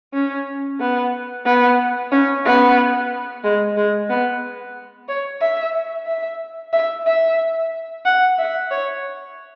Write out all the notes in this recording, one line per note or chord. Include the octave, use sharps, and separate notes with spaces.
C#4
B3
B3
C#4
B3
G#3
G#3
B3
C#5
E5
E5
E5
E5
F#5
E5
C#5